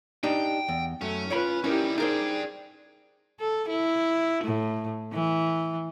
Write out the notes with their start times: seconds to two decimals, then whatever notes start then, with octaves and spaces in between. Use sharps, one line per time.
0.23 D4 D#4 G4 G5
0.69 E2
1.01 F#2 A3 C#4
1.30 F4 B4 C#5 G5 B5
1.64 G3 C#4 D#4 E4 G4 A#4
1.98 D4 D#4 G4 G#4 A#4 C5
3.40 A4
3.69 E4
4.44 A2
5.13 E3